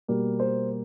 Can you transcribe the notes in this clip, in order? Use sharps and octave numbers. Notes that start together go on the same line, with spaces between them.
B2 G3 A#3
C5